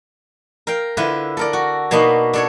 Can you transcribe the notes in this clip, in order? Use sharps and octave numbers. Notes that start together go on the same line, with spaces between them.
A#4 F5 G5
D3 E4 F4 B4
A4 A#4 D5
F#4
B2 A#3 D4 D#4 B5
D4 A4 C#5